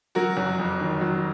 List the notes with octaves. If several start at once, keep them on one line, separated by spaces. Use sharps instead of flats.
F#3 F#4 A#4
F#1
F2
D#3
F#3